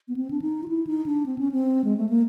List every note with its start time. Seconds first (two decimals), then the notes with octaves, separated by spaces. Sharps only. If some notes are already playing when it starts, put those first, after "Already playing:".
0.08 B3
0.17 C4
0.31 D4
0.42 D#4
0.63 F4
0.68 E4
0.87 D#4
1.06 D4
1.26 C4
1.38 C#4
1.52 C4
1.84 G#3
1.97 A3
2.09 A#3